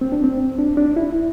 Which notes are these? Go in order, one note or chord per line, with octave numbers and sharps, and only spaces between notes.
C4
D4
C4
D4
D4
E4